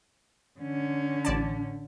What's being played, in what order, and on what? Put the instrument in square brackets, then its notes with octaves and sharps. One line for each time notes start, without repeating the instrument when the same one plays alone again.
[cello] D3 C#4
[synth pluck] A1 D5 A5